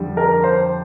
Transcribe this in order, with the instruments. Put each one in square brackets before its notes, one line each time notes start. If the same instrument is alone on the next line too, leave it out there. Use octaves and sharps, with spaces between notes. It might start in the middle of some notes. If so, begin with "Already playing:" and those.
Already playing: [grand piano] F2 D3 G3
A#4
C5